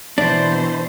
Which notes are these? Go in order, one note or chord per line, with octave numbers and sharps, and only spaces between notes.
B2 E3 D4 C5